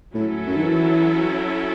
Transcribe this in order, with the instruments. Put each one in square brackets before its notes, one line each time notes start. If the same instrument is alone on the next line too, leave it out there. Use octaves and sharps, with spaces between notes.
[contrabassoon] A2 [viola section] F#3 C#4 E4 A4
[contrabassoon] F#2
D#3
E3